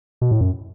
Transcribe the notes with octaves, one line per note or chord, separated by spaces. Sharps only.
B2
A2
F#2